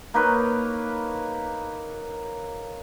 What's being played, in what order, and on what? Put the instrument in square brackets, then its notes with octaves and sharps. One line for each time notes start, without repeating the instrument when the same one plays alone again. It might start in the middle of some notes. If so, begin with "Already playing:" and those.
[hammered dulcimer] A#3 D#4 B4 C#5